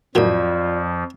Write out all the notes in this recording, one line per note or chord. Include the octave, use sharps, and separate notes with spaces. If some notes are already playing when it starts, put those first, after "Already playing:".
F2 A2 D#3 F3 F#3 F4 D5